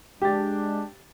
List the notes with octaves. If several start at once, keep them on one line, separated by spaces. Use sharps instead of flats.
G#3 D4 G4 A6